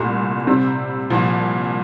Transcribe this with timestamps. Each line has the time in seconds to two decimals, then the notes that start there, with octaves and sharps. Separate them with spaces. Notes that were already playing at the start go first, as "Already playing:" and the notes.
Already playing: C2 A#2 A3
0.47 C3 G3 C4
1.10 C2 A#2 F3